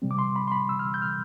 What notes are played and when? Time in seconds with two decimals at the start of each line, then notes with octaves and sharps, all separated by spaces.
0.02 C3 G3 C4
0.11 D6
0.19 C6
0.36 B5
0.48 C6
0.52 B5
0.69 E6
0.79 F6
0.94 G6
1.02 F6